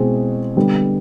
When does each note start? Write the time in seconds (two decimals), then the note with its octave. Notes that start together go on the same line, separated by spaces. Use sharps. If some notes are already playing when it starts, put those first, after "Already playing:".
Already playing: B2 G#3 C4 E4 G#4
0.56 D3 G3 B3